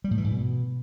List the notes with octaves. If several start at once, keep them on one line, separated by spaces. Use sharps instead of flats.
G3
A2
E3
G#2
B2